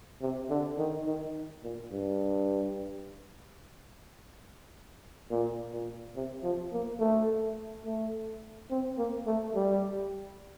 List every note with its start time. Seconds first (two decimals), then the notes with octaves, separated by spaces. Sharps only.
0.22 C3
0.49 D3
0.78 D#3
1.06 D#3
1.63 A#2
1.91 G2
5.30 A#2
5.73 A#2
6.16 C3
6.43 F3
6.72 A#3
7.00 A3
7.85 A3
8.70 C4
8.98 A#3
9.26 A3
9.55 G3